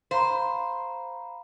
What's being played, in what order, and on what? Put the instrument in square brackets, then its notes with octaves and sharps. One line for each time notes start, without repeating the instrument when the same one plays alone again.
[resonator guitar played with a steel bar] C5 [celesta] F5 A#5 B5